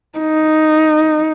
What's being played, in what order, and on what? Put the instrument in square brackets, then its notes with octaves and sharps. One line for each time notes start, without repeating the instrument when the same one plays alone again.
[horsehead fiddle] D#4